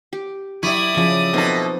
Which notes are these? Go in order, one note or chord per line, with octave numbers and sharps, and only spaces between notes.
G4
F#3 E4 G4 D5 C#6 D#6
C#3 F3 E5 C#7
B2 B3 C4 D#4 A4